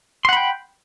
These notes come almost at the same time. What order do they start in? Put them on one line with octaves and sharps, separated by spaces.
C6 F#5 B5 G5